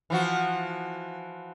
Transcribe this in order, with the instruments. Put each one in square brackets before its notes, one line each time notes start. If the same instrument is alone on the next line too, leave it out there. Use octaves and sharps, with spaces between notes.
[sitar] E3 F3 F#4